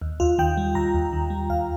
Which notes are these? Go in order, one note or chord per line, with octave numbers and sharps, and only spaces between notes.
D#2
D#2 F4
D#3 G5
G3
D#2 A#5
D#2
D#3
G3
D#2 F5